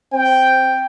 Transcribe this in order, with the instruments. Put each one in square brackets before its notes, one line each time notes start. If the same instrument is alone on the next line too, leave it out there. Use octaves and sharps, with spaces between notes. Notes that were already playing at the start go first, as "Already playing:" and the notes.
[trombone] C4 [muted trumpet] G5